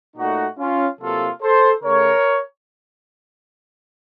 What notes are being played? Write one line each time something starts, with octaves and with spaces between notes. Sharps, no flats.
A#2 A3 D#4 F#4
C#4 F4
C3 F#3 A#3 F4 A4
A4 C5
C#3 A3 A#4 C#5